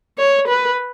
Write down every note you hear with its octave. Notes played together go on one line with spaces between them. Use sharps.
C#5
B4